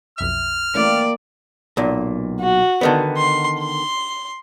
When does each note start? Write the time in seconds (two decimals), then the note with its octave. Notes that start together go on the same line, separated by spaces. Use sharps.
0.18 B1 F2 E5 F6
0.75 E3 A3 A#3 C#4 D5 E5 G5
1.77 B1 A#2
2.40 F#4
2.81 D3 D#3 B3
3.17 C6
3.59 C6